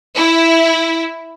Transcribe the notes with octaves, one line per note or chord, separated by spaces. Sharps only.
E4